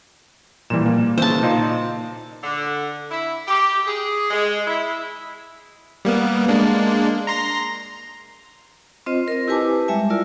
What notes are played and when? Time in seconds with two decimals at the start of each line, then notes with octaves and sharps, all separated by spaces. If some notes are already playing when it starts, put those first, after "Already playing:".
0.70 A#2 E3 F3 G3 E7
0.86 A#3
1.18 C#3 E3 C5 A5
1.43 A#2 D#4 F4
2.43 D3
3.10 E4
3.46 G4
3.86 G#4
4.31 G#3
4.66 E4
6.05 G3 A#3 B3
6.48 G#3 A#3 D4
7.27 A#5 C6 A#6
9.06 C4 F4 C5 D#5
9.28 A#4 D#5
9.48 E4 G4 B4 G#5 A5 D6
9.88 G3 G#3 E5 G#5
10.10 E4 F4 A#4 D5